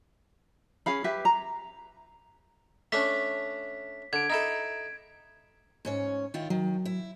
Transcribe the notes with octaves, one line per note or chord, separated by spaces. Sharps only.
C#4 G#4 F5 B5
G4 B4 E5
A#5
A3 C#4 D4 B6
D3 G#6 D7
D#4 E4 A4
G#2 C#4 C#5
D#3 E4 F4
D#3 F#3
E4